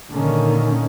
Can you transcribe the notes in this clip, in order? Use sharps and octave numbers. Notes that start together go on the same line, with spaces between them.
A#2 D3 D#3 A#3 C#4